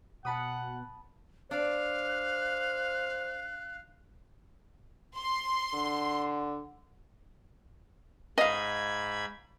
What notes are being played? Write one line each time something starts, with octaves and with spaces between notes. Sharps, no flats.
B2 F#5 A5 B5 D#6
D4 C5 F5 F#6
C6
D3
G#2 D#5 F5 B5 G#6